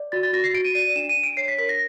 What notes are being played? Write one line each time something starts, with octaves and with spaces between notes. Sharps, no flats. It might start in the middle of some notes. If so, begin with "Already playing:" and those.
Already playing: D5
F#4 A6
A6
F#4 A#6
C7
F#4 D7
D#7
D5 D#7
D#7
D4 E7
D#7
D4
D7
C#5 C7
B6
A#4 B6
A#6